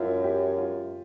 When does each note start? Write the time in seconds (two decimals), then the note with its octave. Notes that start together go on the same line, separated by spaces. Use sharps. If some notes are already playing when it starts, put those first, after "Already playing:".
Already playing: F#2 E4 F4
0.24 G4
0.58 F4